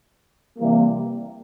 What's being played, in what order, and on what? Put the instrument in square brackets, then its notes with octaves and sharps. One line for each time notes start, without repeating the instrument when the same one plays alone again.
[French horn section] C3 E3 G3 A#3